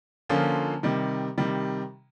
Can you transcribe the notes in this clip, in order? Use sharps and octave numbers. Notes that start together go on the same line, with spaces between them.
D3 F3 A#3 C#4 F4
C3 D#3 G3
C3 D#3 G3